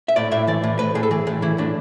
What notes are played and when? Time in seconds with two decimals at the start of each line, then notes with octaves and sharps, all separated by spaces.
0.08 E5
0.16 A2 D5
0.32 A2 E5
0.47 E3 D5
0.63 A2
0.79 A2 B4
0.95 A2 G#4
1.03 A4
1.11 E3 G#4
1.27 A2
1.42 E3 E4
1.58 A2 D4